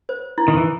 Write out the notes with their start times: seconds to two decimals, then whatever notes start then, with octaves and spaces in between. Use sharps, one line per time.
0.09 C5
0.38 E4
0.48 D#3
0.57 E3